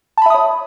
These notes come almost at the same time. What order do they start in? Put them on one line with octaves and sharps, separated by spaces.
A5 B5 E5 D#6 C#5